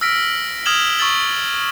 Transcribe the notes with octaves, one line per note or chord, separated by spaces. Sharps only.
E6 F6 A#6 B6 D7
D#6 F6 G#6 E7 F#7 G7
C#6 D#6 E6 A6 F#7 G7